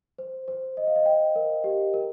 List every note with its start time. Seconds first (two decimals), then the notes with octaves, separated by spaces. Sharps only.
0.19 C5
0.48 C5
0.77 D#5
0.87 F5
0.96 D#5
1.06 G5
1.36 A#4
1.64 G4
1.94 A#4